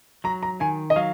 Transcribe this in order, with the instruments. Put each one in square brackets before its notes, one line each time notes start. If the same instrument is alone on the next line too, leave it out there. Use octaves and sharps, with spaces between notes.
[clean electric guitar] F#3 [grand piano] A#5
[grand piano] A#5
[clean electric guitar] D#3 [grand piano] G#5
[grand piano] D#5
[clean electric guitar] F#3 [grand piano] F5